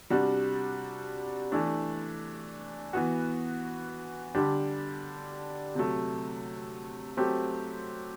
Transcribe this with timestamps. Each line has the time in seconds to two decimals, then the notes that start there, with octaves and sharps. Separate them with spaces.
0.10 C3 G3 D4 F#4
1.52 E3 A3 D4
2.93 E3 B3 F#4
4.35 D3 G3 D4 G4
5.75 C3 F#3 A3
7.17 F#3 A3 C4 G4